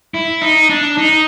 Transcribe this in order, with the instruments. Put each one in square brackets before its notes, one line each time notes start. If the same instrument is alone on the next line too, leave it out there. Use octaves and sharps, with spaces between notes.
[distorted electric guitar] E4
D#4
D4
D#4